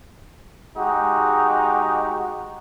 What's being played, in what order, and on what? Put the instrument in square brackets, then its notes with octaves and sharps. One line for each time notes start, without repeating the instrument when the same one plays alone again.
[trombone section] G#3 D#4 F#4 G4